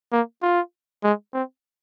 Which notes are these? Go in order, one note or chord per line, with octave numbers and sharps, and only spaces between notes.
A#3
F4
G#3
C4